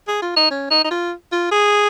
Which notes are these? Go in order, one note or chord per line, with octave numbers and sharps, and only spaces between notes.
G#4
F4
D#4
C#4
D#4
D#4
F4
F4
G#4